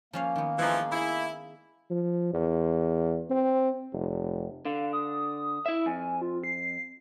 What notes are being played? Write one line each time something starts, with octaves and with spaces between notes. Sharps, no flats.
F3 A#3 C#4 F5
D#3 B3
E3 F3 G#3 D#4
E4 G#4
F3
E2
C4
F1
D3 F5
D#6
E4 E5
F2 G#5
F4
C7